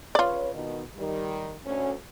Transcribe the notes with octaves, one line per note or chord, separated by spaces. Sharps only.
C#3 F4 B4 C#5 D5
B2 D#3
D#3 G3
D2 C#4